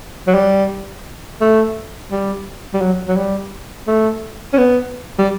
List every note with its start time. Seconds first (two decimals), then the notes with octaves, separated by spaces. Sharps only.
0.27 F#3
0.34 G3
1.41 A3
2.11 G3
2.74 G3
2.81 F#3
3.08 F#3
3.17 G3
3.87 A3
4.53 C#4
4.58 B3
5.19 G3